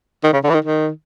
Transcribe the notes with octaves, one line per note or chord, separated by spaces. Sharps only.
D#3
C#3
D3
E3
D#3
D#3